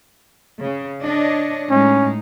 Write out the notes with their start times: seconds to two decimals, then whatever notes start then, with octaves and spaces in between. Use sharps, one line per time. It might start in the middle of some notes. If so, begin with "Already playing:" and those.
0.62 C#3
1.03 D4 C#5 D#5
1.71 A2 G#3 C#4 D#4